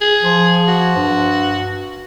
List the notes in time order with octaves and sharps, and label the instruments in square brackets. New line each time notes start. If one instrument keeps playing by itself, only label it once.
[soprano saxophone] G#4
[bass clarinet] F3
[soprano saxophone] F#4
[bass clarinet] G2